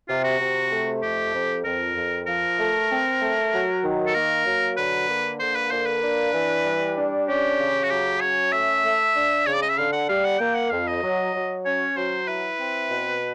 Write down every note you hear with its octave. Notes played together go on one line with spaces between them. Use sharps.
C3 F4
F#4
C3
A3
F2 G4
F2
F2 A#4
F2
F3 A#4
A3
C4
A3
F#3
D#3
A4
A#3 A#4
F#3
D3 B4
A#3
D3 C5
B4
A#3 C5
B4
D4
E3
G3
D4
C#4 G4
C#3
F#4
F#3 G4
C#4 C#5
A3 E5
A3
D4
C#3 C#5
D5
D#5
E5
D3 F5
F#5
G3 F5
F#5
A#3 G5
F#5
F2 F5
D#5
F#3
F#3
C#4 C#5
F#3 C5
E4 B4
C4
B2